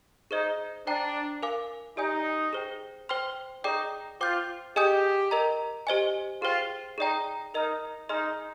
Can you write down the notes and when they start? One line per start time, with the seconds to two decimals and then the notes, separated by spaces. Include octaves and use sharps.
0.31 D#4 G#4 C5 D#5
0.87 D4 C5 G5 A#5
1.42 A#4 F5 G#5 D6
1.97 D#4 G4 D5 G#5 D#6 G6
2.53 G#4 C5 G5
3.09 C5 G5 C6 F6
3.64 D#4 G#4 D5 G5 D6
4.20 F4 C5 G5 D6 G6
4.76 G4 G#4 D#5 G#5 D#6 G6
5.31 A#4 D#5 A#5
5.87 G4 C5 D#5 G#5
6.42 F4 G#4 C5 G5
6.98 D#4 G#4 D5 G5 A#5
7.54 D#4 A#4 D#5 A#5 F6
8.09 D#4 G#4 D#5 G#5 C6 F6